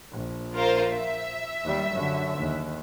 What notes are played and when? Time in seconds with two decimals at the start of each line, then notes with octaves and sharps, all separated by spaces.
0.12 A#1
0.54 F4 A#4 C5
0.92 E5
1.64 D#2 G3
1.93 F#2 D3
2.38 D#2